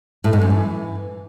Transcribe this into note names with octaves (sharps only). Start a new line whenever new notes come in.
A2
G#2
F#2
E3